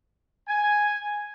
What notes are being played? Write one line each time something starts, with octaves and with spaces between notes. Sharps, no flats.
G#5